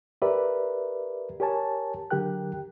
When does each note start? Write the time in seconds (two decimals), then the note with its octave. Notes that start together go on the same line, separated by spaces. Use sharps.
0.22 G4 A#4 B4 D5 E5
1.40 G4 A#4 C#5 G#5 A5
2.11 D3 F#3 G4 A#4 G5 F#6